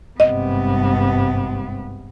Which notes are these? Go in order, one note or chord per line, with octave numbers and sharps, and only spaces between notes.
G#1 G2 C3 B3 D#5